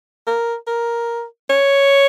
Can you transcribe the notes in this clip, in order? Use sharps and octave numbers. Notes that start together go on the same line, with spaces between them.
A#4
A#4
C#5